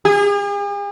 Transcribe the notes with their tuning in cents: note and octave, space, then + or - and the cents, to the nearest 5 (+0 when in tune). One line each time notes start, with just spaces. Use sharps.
G#4 -45